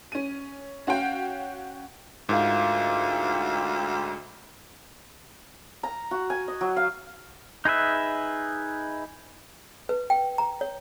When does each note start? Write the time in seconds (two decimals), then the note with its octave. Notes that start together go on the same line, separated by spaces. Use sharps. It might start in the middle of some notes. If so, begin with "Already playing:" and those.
0.12 C#4 D#7
0.87 C#4 F#4 F5 G5
2.29 D2 G#2 F4 A#4 F5
5.83 A#5
6.11 F#4
6.30 G#5
6.48 D#5
6.61 F#3
6.76 F5
7.65 D#4 G#4 B4 E5
9.89 B4
10.10 G5
10.38 A#5
10.61 C#5